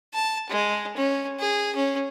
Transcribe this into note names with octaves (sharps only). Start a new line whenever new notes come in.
A5
G#3
C#4
G#4
C#4